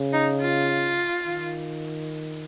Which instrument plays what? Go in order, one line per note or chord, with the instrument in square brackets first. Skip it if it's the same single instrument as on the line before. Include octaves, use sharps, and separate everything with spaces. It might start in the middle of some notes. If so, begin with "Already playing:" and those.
Already playing: [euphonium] C#3
[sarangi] D#4
F4
[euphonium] D#3